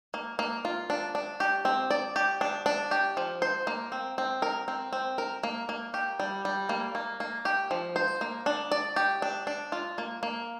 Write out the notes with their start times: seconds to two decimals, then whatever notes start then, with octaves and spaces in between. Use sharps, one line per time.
0.14 A#3
0.39 A#3
0.65 F4
0.90 D4
1.15 D4
1.40 G4
1.65 C4
1.91 D5
2.16 G4
2.41 D4
2.66 D4
2.91 G4
3.17 F3
3.42 C5
3.67 A#3
3.92 C4
4.18 C4
4.42 A#4
4.68 C4
4.93 C4
5.18 A#4
5.43 A#3
5.69 A#3
5.94 G4
6.20 G3
6.45 G3
6.69 A#3
6.95 A#3
7.20 A#3
7.45 G4
7.71 F3
7.96 C5
8.21 A#3
8.46 D4
8.72 D5
8.96 G4
9.22 D4
9.47 D4
9.72 F4
9.98 A#3
10.23 A#3